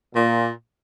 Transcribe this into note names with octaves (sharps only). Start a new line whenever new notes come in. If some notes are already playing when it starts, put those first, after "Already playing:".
A#2